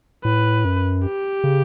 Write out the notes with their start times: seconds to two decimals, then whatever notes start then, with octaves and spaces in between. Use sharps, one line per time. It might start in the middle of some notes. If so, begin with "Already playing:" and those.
0.25 A2 B4
0.65 F#2
1.05 G4
1.44 C#3